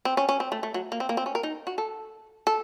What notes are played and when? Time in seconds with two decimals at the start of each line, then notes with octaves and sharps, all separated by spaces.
0.05 C4
0.17 C#4
0.29 C#4
0.40 C4
0.52 A3
0.63 A3
0.74 F#3
0.92 A#3
1.00 C4
1.09 A#3
1.17 C4
1.26 C#4
1.35 A#4
1.43 D#4
1.67 F#4
1.78 A4
2.47 A4